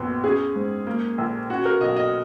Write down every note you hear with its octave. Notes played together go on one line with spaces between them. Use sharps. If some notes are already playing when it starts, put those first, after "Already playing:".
Already playing: A#1 F#2 B3
C#4 G#4
G#2
A#3
A#1
C#4 F#4
A#4
B1 D#5
D#5